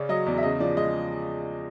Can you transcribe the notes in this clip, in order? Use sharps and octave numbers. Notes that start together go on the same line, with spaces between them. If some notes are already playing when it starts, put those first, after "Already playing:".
Already playing: C#3 C#4 D5
F#3 D#5
E2 D5
E5
C#3 D#5
F3 D5
G#3 D#5